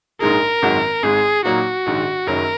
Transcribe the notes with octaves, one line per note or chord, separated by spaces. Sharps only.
A#1 G#2 G#3 D#4 G#4 A#4
G#1 F#2 D#3 G#3 F#4
G#1 G#2 G#3 G#4
A#2 F#3 A#3 D#4 F#4
A#1 G#2 D#3
F#1 F#2 D#3 F#3 A#4